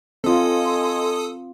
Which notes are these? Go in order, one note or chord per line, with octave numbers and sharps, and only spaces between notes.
C4 F4 A4 D#5 G#5 C6 D#6